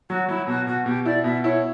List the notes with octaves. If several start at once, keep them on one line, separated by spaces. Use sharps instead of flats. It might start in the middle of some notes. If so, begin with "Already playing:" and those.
F#3 F#4
F#3 E4
B2 F#4
B2 F#4
B2 G4
E4 D5
B2 E5
E4 C#5